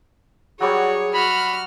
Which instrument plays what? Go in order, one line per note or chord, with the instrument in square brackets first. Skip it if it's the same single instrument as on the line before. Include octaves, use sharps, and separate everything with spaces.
[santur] F#3 G3 D5 [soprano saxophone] F#4 [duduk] G#4 [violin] C#5
[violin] F#4 F6 [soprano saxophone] B5